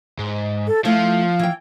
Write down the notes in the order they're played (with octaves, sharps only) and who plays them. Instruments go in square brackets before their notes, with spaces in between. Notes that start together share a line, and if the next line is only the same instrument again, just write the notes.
[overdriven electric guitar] G#2
[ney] A4
[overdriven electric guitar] F3 [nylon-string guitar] A3 E4 [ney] F5
[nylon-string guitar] E3 G5